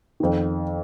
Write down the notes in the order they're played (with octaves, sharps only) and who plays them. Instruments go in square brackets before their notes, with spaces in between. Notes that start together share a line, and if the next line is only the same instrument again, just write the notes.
[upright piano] F2 D#3